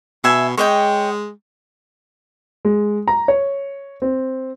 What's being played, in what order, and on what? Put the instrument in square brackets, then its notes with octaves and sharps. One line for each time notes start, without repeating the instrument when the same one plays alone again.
[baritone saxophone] B2 [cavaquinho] E5 G#5
[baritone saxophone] G#3 [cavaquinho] C#5 D#5 G5
[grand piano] G#3
A#5
C#5
C4